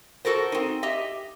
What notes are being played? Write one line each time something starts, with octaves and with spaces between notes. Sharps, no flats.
F#4 A4 A#4 C5
C4 D#4
G4 D#5 E5